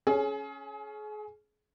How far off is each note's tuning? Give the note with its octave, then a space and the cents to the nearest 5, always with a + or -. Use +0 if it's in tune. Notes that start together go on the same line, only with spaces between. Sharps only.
C#4 +0 G#4 +35